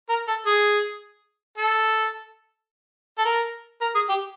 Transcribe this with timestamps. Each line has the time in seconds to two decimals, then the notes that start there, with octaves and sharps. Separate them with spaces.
0.09 A#4
0.28 A4
0.46 G#4
1.58 A4
3.18 A4
3.25 A#4
3.81 A#4
3.95 G#4
4.09 G4